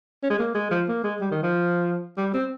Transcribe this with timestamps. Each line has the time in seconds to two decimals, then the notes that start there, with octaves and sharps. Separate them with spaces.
0.23 C#4
0.30 G#3
0.39 A#3
0.55 G#3
0.71 F3
0.88 A#3
1.04 G#3
1.21 G3
1.31 D#3
1.43 F3
2.18 G3
2.34 C4